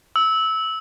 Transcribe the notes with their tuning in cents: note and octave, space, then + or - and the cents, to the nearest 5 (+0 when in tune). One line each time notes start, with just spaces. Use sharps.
E6 -20